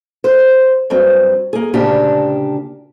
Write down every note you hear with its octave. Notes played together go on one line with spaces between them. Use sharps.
C5
G2 F#3 C4
A#3 G#4
D2 A#2 C#3 D4 G4 A5